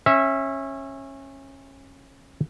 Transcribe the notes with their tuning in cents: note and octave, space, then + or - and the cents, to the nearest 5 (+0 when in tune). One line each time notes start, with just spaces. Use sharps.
C#4 -25 E5 +0